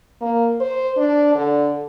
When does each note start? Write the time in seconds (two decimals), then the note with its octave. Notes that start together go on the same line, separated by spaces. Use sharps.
0.21 A#3
0.61 C5
0.97 D4
1.35 D3